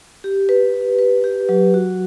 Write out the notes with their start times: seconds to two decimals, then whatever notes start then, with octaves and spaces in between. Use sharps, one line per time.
0.24 G4
0.49 B4
0.74 G4
0.99 B4
1.24 G4
1.49 F#3
1.74 F#4